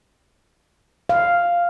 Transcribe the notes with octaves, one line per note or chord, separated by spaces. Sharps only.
F5